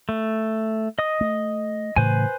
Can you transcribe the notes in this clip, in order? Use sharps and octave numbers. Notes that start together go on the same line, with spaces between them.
A3
D#5 D#6
A3
A2 C#3 E3 B4 C5 G#5